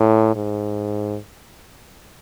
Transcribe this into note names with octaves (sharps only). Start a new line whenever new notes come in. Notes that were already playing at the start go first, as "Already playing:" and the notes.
Already playing: A2
G#2